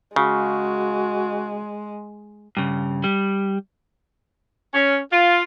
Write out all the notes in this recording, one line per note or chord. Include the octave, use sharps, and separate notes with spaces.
C#3 G#3 F#4
G2 C#3
G3
C#4
F4